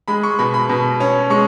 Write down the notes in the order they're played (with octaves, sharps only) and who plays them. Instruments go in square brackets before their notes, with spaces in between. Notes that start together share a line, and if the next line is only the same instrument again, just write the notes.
[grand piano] G#3 B5
C#6
B2 B5
B5
B2
C#4
G#3 C#6